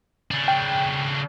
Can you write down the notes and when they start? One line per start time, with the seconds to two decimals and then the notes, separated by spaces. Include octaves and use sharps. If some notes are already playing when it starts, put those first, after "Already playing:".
0.31 C#3 D4
0.48 G5